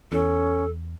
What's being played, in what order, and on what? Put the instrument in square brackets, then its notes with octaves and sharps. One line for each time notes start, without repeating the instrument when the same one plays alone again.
[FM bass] E2 [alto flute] C#4 [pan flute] A4